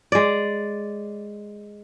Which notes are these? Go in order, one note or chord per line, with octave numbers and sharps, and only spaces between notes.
G#3 D5